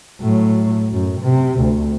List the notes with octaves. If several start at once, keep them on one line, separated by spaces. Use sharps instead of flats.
A2 F#3
F#2
C3
D2